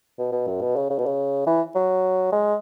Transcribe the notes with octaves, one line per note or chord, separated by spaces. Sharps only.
B2
B2
F#2
B2
C#3
C#3
B2
C#3
E3
F#3
G#3